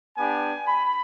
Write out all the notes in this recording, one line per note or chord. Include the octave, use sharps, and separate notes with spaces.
B3 D4 G4 G#5
B5